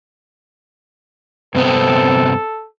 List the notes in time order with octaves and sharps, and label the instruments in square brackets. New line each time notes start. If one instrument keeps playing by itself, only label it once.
[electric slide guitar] G2 C3 B3 [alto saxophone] C4 [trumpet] A4